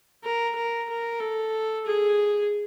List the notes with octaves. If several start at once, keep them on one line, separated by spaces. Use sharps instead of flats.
A#4
A#4
A#4
A4
G#4